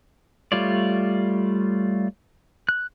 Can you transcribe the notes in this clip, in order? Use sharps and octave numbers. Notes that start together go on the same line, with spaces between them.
G3 A3 F4 C#5 D5
F#6